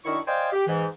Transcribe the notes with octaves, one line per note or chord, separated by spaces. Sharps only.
F#2 D#3 D4 E4 C#6
C5 D5 D#5 F5 G5 G#5
G4
G#2 E3